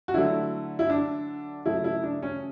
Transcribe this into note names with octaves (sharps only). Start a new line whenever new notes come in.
F#4
D3 F#3 A3 E4
E4
D4
C#3 F#3 A3 E4
E4
D4
C#4